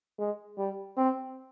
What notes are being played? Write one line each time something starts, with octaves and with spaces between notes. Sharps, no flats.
G#3
G3
C4